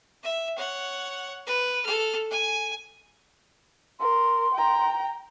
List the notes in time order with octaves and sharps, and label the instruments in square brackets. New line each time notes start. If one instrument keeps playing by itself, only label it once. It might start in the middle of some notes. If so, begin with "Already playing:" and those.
[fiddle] E5
C#5 F#5
B4
A4 F6
G#5
[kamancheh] A#4 [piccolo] C6
[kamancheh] G5 A#5